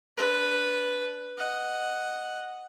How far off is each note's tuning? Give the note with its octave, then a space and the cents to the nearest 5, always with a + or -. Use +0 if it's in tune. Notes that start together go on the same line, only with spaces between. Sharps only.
D4 -15 B4 +0
D#5 +0 F#5 +0